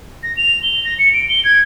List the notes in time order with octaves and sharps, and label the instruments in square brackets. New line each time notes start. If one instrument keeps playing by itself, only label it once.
[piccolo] A#6
F7
G7
A#6
C#7
D7
G7
G#6